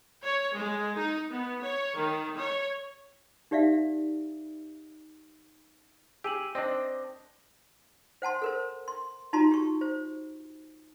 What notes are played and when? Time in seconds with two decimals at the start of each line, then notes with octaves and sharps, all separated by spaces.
0.23 C#5
0.56 G#3
0.96 D#4
1.31 B3
1.62 C#5
1.96 D#3
2.37 C#5
3.51 D#4 G4 D5 E5 F5
6.24 G4 G#4 E6 D#7 F#7
6.55 C4 D4 C5 D5 D#5
8.22 C5 F#5 A5 C6
8.42 A4 A#4 C5
8.88 C6
9.33 D#4 F4 F#4 A5 A#5 C6
9.51 G4 C#6
9.81 C5